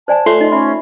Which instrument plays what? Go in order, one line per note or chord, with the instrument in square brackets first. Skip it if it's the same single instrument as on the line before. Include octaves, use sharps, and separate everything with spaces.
[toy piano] C5 D5 G#5 [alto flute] A5
[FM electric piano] A3 C6 [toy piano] F4 C#5
[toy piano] D#4 [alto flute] D#5
[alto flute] C#4 [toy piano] E5 B5